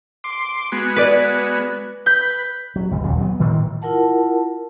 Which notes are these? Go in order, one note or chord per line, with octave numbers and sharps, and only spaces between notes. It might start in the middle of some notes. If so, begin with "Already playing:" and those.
C6 D6
G#3 B3 F#4
B4 D5
B4 G6
F#3
G1 C#2
A#1 D#2 C#3 F#3
F#3 B3
A2 D#3 E3
E4 F4 A#4 F#5 A5